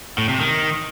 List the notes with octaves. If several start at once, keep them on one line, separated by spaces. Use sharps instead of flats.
A2
C3
D#3